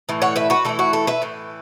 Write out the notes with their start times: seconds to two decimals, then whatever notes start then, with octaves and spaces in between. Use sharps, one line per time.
0.09 A2 E3
0.22 C#5 F#5
0.36 B4 E5
0.50 F#4 B4
0.65 E3 A3 E4 A4
0.79 F#4
0.93 A4
1.07 B4 E5
1.22 A2 E3